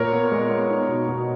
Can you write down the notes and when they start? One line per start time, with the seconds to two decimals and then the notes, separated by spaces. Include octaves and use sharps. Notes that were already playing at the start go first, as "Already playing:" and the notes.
Already playing: A#2 A#4 C#5
0.13 B3
0.32 G#3
0.50 B3
0.70 D#4
0.89 B2
1.09 B2